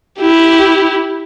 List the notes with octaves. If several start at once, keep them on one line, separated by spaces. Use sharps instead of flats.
E4 G4